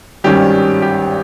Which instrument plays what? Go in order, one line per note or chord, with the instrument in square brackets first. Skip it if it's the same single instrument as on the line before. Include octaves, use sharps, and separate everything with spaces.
[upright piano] G#1 G2 D#3 G3 C#4 G4
G4